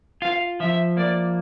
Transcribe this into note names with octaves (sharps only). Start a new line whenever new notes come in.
F4 F5
F3 E5
A#3 D5